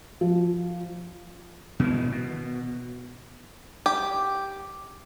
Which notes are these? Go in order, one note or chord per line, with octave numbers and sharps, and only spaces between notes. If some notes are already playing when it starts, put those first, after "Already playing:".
F3
B2 D#3 E3
B2
G4